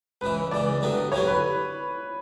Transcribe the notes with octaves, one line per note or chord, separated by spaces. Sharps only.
C#2 C#3 E3 B4
C#2 C#3 E3 D5
G2 D3 F#3 B3
G2 D3 F#3 B3 C#5
B4